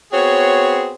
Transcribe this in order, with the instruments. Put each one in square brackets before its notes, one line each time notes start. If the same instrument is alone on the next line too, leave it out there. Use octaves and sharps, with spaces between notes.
[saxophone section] B3 C4 F#4 G#4 C5 C#5